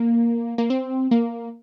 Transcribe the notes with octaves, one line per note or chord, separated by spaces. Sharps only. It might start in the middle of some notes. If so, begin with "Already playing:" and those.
Already playing: A#3
A#3
C4
A#3